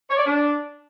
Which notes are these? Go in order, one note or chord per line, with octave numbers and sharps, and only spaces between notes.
C#5
D5
D4